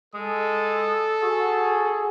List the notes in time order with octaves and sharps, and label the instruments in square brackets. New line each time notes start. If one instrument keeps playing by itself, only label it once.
[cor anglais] G#3 [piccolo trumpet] A4 [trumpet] D#6
[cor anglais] F#4 [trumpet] G#4